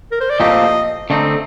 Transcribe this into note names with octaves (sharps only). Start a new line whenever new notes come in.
A#4
C5
D5
A#2 F3 A3 C4 G4 D#5
D3 A3 C4 D#4